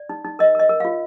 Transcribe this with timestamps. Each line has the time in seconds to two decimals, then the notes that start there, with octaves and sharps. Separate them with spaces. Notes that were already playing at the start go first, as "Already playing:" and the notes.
Already playing: D5
0.09 D#4
0.25 D#4
0.39 A#4 D#5
0.55 A#4 D#5
0.69 A#4
0.80 F4 F5